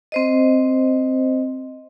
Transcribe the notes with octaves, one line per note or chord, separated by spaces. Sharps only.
C4 C5 D#5